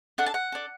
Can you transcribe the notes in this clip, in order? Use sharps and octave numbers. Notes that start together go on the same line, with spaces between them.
D4 A4 F#5
A5
F#5
D4 A4